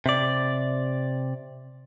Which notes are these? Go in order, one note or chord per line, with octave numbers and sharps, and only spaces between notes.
C3 D5